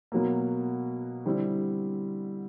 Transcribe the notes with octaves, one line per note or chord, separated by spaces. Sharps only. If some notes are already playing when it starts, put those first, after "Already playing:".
B2 F#3 A#3
D3 G3 C4 E4